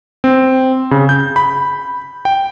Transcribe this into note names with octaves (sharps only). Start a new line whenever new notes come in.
C4
C#3
G6
B5
G5